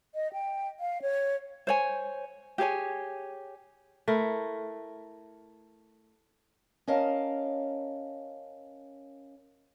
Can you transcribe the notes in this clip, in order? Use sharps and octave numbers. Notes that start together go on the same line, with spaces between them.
D#5
G5
F5
C#5
C5 C#5 G#5
G4 G#4 C#5 G#5
A3 E4 A#4
C#4 A#4 D#5 F5 A5